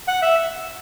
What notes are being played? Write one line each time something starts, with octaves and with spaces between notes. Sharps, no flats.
F#5
E5